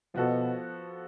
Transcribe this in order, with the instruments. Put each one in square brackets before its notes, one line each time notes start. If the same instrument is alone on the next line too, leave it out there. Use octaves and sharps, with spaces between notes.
[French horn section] B2 [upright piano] F3 B3 F#4 A4